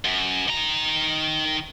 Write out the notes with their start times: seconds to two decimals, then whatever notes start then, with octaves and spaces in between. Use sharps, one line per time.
0.05 F#2
0.48 D#3 A#5